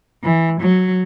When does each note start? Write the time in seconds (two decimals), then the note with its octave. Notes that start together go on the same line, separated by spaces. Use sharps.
0.23 E3
0.60 F#3